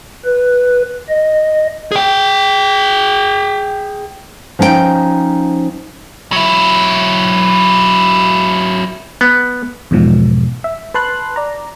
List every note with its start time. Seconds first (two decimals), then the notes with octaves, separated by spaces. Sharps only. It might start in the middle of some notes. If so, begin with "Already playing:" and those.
0.25 B4
1.09 D#5
1.92 G#4 G5
4.59 F3 C#4 D#4 E4 G5
6.32 F#3 E4
9.21 B3
9.91 E2 G#2 B2 F3
10.64 E5
10.94 B4 A5 C6 F#6
11.36 D5 A#5